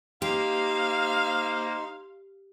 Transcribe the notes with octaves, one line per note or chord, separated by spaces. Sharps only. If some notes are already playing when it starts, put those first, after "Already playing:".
A#3 D#4 G4 C5 F5 C6